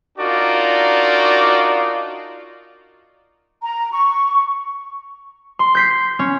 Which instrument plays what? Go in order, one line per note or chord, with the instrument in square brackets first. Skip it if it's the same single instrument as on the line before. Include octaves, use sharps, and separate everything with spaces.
[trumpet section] D4 D#4 F4 F#4 A#4 D5
[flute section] A#5
C#6
[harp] C6
G6 B6 C7
C#4